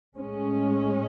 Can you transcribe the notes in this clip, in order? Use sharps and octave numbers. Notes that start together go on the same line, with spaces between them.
A2 G#3 C#4